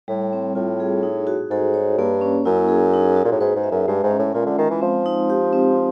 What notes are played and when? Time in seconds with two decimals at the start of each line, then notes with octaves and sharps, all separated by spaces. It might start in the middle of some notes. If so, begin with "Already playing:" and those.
0.08 A2 G3
0.33 C4
0.55 A2 F4
0.80 G#4
1.03 D#4
1.27 F#4
1.51 G#2 A4
1.74 C#5
1.98 G2 A#3
2.21 C#4
2.46 F#2 E4
2.68 G#4
2.93 D#4
3.16 F#4
3.25 A#2
3.32 A2
3.40 G#2 B4
3.56 G#2
3.64 E5
3.71 F#2
3.88 G2 G#3
4.03 G#2
4.11 C#4
4.19 A2
4.34 A#2 F4
4.46 D3
4.58 D#3 G#3
4.70 E3
4.82 F3 C4
5.06 D#4
5.30 G4
5.53 C4